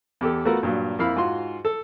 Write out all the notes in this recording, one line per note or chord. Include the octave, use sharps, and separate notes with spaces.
E2 G4 A4
A3 B3 F4 F#4 A4 A#4
G2 A#2 F#3
F2 A#3 E4 F5 B5
G#2 F4 F#4 C6
A4